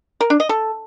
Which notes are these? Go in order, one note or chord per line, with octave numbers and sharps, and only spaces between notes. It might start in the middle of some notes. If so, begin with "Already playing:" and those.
A#4
D4
D#5
A4